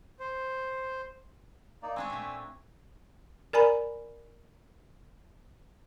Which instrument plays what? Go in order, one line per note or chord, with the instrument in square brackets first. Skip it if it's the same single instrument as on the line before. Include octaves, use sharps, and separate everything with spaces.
[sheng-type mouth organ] C5
[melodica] A#3 D#4 D5
[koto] C4 D4 C#5 [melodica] G#5 E6
[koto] A#2 A3
[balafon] A#4 D5 G#5 A#5 B5